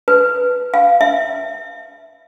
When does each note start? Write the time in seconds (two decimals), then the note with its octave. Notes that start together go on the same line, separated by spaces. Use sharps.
0.08 B4
0.74 F5
1.01 E5